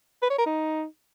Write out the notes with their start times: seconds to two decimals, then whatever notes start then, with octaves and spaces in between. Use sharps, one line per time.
0.22 B4
0.30 C#5
0.38 A#4
0.46 D#4